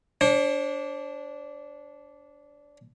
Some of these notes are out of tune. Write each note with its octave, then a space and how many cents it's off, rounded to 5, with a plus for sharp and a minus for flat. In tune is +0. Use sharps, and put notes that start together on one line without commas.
D4 -15 C5 +40